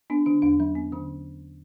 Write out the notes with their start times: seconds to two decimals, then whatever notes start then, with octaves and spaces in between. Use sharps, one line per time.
0.10 B3 D4
0.26 D3 D4
0.42 E2 D4
0.60 F#3 C#4
0.75 B3
0.92 D3 C#4